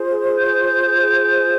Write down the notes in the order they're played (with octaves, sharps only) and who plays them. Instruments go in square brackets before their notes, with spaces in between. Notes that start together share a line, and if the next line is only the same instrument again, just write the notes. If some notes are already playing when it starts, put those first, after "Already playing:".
Already playing: [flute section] F4 G#4 C5
G6